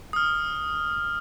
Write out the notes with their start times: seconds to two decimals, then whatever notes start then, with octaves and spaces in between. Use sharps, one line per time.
0.13 D#6 F6